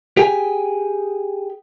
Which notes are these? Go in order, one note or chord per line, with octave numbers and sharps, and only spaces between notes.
G4 G#4 G5 G#5